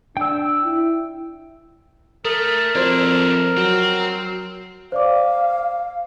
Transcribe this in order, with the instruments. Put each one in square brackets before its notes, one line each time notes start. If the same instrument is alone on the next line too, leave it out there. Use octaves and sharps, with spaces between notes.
[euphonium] D4 [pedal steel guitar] G5 E6
[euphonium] E4
[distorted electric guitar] A3 [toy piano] A4 [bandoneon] A#4
[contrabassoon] F2 [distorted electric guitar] D4 E4 [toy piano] F#4 C5 D5
[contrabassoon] F#3 [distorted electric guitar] C4
[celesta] C5 D5 D6 [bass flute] F5